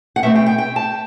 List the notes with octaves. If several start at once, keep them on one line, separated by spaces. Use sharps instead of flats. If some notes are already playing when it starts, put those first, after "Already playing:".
F#5
B2 A3 C4 E5
G5
G5
G5
A5